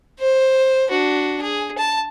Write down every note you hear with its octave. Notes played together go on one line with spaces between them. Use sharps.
C5
D4 F#4
G#4
A5